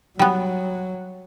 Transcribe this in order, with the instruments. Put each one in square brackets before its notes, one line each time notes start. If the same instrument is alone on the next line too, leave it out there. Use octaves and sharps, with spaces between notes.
[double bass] F#3 [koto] G3 B3